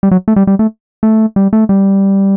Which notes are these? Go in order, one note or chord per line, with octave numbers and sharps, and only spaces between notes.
G3
F#3
A3
G3
G3
A3
A3
G3
A3
G3